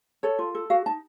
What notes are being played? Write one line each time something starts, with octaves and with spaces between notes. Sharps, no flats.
A4 C#5
F4
A4
F#4 F5
D#4 A5